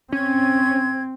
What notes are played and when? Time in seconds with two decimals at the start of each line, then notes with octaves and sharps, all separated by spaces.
0.12 C4 C#4 G#6